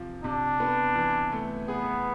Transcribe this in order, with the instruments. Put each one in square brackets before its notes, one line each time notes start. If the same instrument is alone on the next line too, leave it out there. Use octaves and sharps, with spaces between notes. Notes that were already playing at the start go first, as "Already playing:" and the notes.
Already playing: [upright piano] C3 F3
[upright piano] C3 [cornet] D4
[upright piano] B3
E3
A3
[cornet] B3 [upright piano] G#4